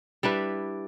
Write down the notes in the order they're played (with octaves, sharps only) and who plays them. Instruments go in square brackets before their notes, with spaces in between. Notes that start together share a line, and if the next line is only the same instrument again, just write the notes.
[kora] G3 D4 E4 B4